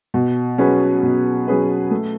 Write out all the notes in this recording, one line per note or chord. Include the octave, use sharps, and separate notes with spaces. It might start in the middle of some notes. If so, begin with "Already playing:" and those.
B2
F#3 C#4 G#4 B4
B2
F#3 C#4 G#4 B4
A3